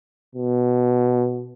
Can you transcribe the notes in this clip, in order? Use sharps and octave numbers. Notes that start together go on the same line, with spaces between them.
B2